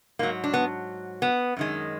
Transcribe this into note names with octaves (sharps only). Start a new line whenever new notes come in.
G#2 F#3 A#3
D4
B3
B3
F#2 D#3 G#3